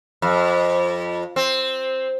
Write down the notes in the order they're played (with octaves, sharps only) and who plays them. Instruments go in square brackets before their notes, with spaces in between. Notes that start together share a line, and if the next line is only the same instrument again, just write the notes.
[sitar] F2
C4